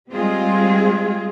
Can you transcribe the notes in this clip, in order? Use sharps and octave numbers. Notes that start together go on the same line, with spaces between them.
G3 G#3 C4 F4 G#4